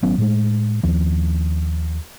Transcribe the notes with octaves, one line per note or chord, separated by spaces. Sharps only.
G#1 F#3 B3 C#4
A2 G#3
D#2 F3